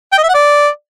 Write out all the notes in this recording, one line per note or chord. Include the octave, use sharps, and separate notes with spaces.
G5
D#5
E5
F#5
D5